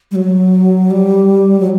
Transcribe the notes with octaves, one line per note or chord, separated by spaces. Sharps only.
G3
F#3
G3
F#3